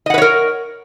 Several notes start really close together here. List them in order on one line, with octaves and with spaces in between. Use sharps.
D#5 F#5 B4 C#5 A#4